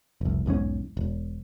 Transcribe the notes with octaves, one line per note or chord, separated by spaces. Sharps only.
F1 C2
B1 E2 G#2 C#4
E1